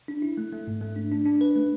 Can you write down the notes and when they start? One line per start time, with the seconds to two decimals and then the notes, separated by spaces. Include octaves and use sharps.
0.08 D4
0.22 E4
0.38 A3
0.52 A3
0.67 G#2
0.81 A3
0.96 D4
1.11 D4
1.26 D4
1.41 B4
1.56 A3